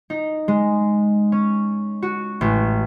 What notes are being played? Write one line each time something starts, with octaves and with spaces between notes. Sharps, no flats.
D#4
G#3
C#4
F#4
A1